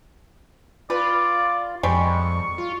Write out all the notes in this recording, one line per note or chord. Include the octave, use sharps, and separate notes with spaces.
F4 B4 D5
F2 G3 G#3 C#6
F4